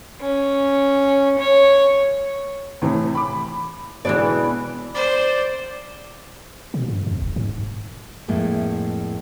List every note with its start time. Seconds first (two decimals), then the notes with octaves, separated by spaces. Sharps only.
0.20 C#4
1.38 C#5
2.82 A2 C3 E3
3.15 B5 D6
4.05 B2 D3 E3 G#3 B3 D5
4.94 C5 D5
6.74 B2
6.88 G2
7.07 F2
7.22 D#1
7.36 G#2
8.28 F2 A2 G#3 A#3